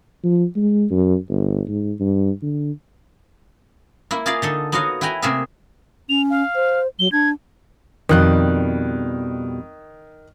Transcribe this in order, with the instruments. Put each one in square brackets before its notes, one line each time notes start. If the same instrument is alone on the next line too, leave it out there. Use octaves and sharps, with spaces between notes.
[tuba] F3
G#3
F#2
G1
G#2
G2
D3
[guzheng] A#3 E4
F4 G#4 A#4 D5 F5
D3 D#4 A4
B3 D#4 F#4 C#5 D#5 F5
E4 B4 G5 G#5 A#5
C3 A3 A#3 G#4 A#4 E5
[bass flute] C#4 [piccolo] F7
[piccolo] F5
[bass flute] C5
[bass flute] F#3 [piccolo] G7
[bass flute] D4 [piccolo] G#6
[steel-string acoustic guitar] F2 B2 G3 [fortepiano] D#3 F#6